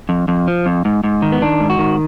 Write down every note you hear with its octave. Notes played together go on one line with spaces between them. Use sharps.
F2
F2
F3
F2
G#2
G#2
D#3
B3
D#3 D4
G#2
F#4
D#3